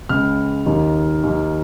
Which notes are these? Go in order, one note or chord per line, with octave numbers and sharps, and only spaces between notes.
C#2 C#3 F6
D#2 D#3
D#2 D#3